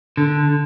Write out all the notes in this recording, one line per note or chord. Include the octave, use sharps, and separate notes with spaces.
D3